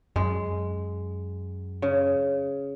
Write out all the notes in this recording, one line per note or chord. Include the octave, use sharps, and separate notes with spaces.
F#2 G#3
C#3